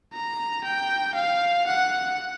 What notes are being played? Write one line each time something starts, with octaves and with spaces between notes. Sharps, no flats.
A#5
G5
F5
F#5